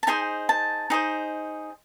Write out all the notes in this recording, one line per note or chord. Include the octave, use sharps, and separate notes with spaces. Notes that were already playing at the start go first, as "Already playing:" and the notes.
A5
D#4 G#4 C5 G#5
A5
D#4 G#4 C5